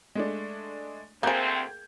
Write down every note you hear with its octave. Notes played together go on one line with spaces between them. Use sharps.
G#3 A3 D4
D2 A#3 C4 G#4 G5 G6 G#6